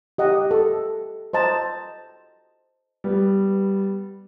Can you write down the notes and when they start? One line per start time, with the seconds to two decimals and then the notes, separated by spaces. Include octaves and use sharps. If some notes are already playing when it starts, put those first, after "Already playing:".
0.18 G4 D#5 F#5
0.51 A4
1.33 C5 D#5 A5 A#5
3.04 G3 B3